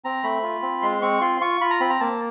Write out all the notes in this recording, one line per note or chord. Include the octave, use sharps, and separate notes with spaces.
C4 A#5
A3 B5
F4
C4
G#3 C6
C4 C#6
F4 C6
F4 C#6
F4 B5
A#5
C4 B5
A#5
A#3 A5